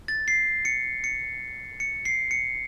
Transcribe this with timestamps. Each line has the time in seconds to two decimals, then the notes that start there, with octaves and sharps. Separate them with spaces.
0.08 A6
0.28 C7
0.65 C#7
1.04 C#7
1.80 C#7
2.05 C7
2.31 C#7